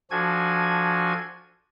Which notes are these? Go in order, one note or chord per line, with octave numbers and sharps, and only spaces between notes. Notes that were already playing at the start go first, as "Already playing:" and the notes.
F3 D4 F#4 A4 G#5 G#6